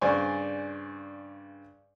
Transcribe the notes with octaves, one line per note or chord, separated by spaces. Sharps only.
G2 C#3 C5 D5 G#5 C#6